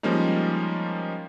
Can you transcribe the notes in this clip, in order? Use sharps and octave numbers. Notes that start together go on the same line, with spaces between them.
F3 G3 G#3 A#3 C#4 D#4